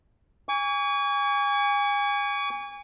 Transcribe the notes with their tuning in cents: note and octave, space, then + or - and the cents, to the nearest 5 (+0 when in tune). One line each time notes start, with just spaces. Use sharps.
G#5 -30 C#6 +40